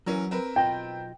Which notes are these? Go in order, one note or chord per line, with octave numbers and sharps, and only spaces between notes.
E3 F#3 C#4 A#4
C4 A#4 B4
B1 F4 D#5 G5